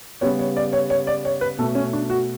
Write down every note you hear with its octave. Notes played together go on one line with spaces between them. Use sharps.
C#3 G3 B3 C#5
C#5
D5
C#5
C#5
D5
C#5
B4
B2 A3 A4
C#4
D4
F#4